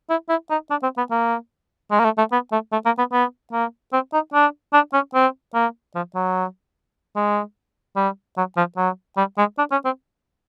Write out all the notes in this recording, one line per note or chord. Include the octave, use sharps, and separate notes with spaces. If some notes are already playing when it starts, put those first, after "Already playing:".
E4
E4
D#4
D4
C4
B3
A#3
G#3
A#3
A3
A3
B3
A3
A3
A#3
B3
B3
A#3
C4
D#4
D4
D4
C#4
C4
A#3
F3
F#3
G#3
G3
F#3
F3
F#3
G3
G#3
D4
C#4
C4